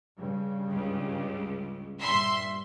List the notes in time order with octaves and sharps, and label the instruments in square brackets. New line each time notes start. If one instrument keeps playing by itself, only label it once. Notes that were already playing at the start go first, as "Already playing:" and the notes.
[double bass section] G2 C#3
[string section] C#2
[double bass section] G2 A#2 [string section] E5 C6